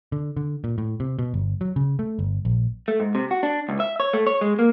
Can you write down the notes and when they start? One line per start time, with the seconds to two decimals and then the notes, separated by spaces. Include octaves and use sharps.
0.12 D3
0.37 D3
0.64 A#2
0.78 A2
1.00 C3
1.19 B2
1.34 G1
1.61 F#3
1.76 C#3
1.99 A3
2.19 G1
2.45 A#1
2.88 A3
3.00 G#2
3.15 C3
3.31 F#4
3.43 D4
3.69 C#2
3.80 E5
4.00 C#5
4.13 A3
4.27 C#5
4.41 G#3
4.59 A#3